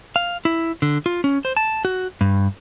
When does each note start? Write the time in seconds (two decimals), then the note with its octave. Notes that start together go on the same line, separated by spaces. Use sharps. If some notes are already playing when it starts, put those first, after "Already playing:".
0.16 F5
0.45 E4
0.82 D3
1.06 F4
1.24 C#4
1.45 C5
1.57 A5
1.85 F#4
2.21 G2